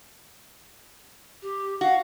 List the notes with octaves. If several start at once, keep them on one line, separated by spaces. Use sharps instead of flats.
G4
F#4 F5